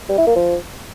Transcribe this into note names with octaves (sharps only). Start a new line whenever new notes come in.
G3
E4
A#3
F3